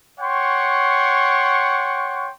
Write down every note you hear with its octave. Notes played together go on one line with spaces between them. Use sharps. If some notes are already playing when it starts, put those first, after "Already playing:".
C#5 F#5 G5 C6 C#6